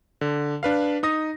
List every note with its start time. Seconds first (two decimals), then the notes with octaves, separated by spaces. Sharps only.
0.21 D3
0.63 D4 B4 F5
1.03 D#4 D#6 A#6